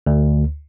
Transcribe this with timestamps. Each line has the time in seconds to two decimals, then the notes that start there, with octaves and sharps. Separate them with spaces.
0.06 D2